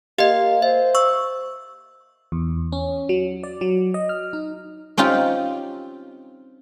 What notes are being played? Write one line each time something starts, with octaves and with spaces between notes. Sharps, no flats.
A#3 G4 D#5 F5
C5 E5
C#6 E6
E2
C#4
F#3
D5
F#3
D#5
F6
D#4
C4 C#4 D#4 F4 G4